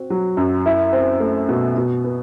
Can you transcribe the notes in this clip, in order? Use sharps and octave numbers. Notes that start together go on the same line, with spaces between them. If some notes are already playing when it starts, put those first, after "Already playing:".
Already playing: C4 F#4
F#3
F#2
E4
C4
A3
B2
B2
B3